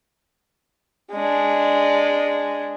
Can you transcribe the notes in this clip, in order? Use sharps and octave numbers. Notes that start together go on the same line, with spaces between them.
G#3 D4